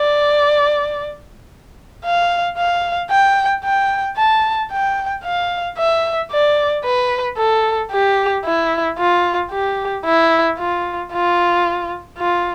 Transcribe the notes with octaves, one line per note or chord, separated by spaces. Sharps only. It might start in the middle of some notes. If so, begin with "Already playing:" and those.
Already playing: D5
F5
F5
G5
G5
A5
G5
F5
E5
D5
B4
A4
G4
E4
F4
G4
E4
F4
F4
F4